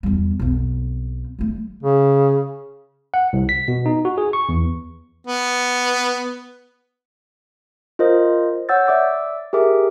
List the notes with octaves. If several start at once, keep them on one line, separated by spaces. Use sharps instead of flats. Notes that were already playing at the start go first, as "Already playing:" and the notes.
E2 G3
B1 F2
F#3 A3
C#3
F#5
C2
B6
B2
D#4
F#4
G#4
C#6
E2
B3
F4 A#4 C5 D#5
C#5 F#5 E6 G6 A6
D5 E5 D6 E6 A6
G4 G#4 A#4 E5 D6